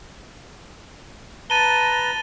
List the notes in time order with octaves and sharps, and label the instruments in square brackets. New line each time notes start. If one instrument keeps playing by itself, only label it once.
[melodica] B4 A5 A#5 [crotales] A6 D#7 G7